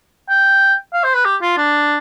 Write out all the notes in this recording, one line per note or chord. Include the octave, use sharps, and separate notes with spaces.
G5
F5
C5
B4
G4
F4
D4